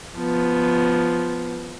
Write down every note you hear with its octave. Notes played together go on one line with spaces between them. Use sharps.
F3 B3